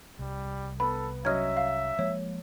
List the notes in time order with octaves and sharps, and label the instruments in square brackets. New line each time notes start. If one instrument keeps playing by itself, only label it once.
[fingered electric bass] C2 [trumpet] G3
[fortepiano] B3 [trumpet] A4 [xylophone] B5
[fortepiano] F#3 C#4 D#5 [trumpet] E5 [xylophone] F6 G#6
[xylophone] F5
[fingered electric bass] F3 G#3 A#3 [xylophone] C#5